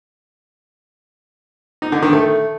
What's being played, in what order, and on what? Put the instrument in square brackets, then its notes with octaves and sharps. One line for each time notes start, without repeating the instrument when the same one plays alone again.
[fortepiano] D#4
D3
D#3
A3